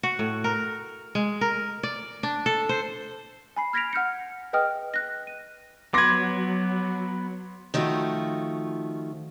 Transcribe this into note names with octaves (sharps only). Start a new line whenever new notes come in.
F#4
A2
A#4
G#3
A#4
D5
D4
A4
C5
G#5 B5 C7
F6 G#6 A#6 B6 D7 F7
F#5 F6 G6 C#7
G#4 B4 D#5 G5 D#6 F6
F#6 A#6
D#7
F#3 B3 B4 C6 D6 G#6 A#6
D#3 F3 A3 F4 F#4